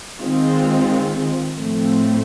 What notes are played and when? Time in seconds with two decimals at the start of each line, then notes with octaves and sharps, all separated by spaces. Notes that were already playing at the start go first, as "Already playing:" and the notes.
0.20 D#3 G#3 C4 F4
1.57 A2 F3 A3 C4